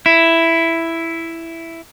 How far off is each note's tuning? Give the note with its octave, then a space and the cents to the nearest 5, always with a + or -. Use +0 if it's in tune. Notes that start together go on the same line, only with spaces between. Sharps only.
E4 +5